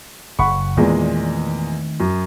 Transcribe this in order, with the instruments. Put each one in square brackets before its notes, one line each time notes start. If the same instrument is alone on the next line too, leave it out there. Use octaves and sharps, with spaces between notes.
[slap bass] F#1 [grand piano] F#5 B5 C#6
[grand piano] E2 A#2 G#3 [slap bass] D#3 A3 C4
[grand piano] F#2